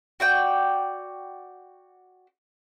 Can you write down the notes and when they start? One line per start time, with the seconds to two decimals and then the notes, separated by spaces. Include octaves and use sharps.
0.20 F#4 D5 G5